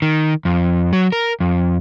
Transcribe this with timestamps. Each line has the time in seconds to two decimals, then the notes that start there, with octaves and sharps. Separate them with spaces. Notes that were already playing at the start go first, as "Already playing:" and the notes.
0.02 D#3
0.45 F2
0.93 F#3
1.12 A#4
1.40 F2